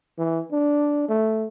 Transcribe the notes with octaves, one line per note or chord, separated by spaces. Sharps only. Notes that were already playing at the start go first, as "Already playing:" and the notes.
E3
D4
A3